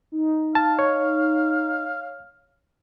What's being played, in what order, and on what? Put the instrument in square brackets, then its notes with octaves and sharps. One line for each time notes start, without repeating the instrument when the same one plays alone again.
[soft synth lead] D#4
[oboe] F5 [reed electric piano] A5
[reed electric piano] C#5